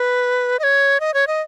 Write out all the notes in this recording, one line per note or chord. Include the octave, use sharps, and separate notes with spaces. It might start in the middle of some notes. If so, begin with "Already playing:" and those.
Already playing: B4
D#5
C#5
D#5
C#5
D#5